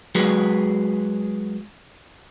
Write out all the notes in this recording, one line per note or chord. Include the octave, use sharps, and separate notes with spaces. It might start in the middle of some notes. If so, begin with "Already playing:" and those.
F#3 G#3 F#4 G#4 B4